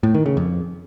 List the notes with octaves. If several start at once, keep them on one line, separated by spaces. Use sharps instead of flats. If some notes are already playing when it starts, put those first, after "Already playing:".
A2
D#3
C#3
F2